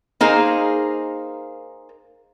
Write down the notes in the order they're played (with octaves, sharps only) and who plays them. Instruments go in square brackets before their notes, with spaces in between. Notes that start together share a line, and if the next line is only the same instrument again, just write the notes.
[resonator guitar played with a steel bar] A#3 D#4 G#4 A#4 C5